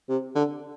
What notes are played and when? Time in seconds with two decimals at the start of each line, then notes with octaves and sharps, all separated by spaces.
0.09 C3
0.35 D3